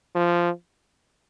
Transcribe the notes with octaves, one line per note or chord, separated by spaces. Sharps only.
F3